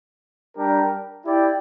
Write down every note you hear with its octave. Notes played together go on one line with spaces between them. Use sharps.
G3 D4 G4 A#4
E4 G4 D5 G5